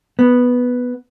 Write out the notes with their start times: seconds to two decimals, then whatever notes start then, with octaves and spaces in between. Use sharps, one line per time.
0.19 B3